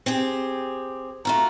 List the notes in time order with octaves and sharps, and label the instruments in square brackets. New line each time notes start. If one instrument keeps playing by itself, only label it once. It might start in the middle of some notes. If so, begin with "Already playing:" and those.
[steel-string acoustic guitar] C4 G4 G#4
[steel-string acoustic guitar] A3 F4 F#4 [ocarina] A#5